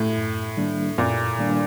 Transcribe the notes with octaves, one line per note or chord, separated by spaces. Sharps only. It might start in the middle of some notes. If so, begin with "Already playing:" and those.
Already playing: A2
F#2
D#3 G3 A#3 D4
F#2 A#2
D#3 G3 A#3 D4